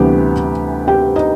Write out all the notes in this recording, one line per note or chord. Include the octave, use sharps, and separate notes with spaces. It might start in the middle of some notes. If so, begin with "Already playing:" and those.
Already playing: D2 C3 E3 G3 B3 G4
G4 G5
D#4 D#5